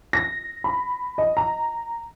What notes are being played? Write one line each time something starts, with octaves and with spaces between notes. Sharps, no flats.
A#6
B5
D#5
A#5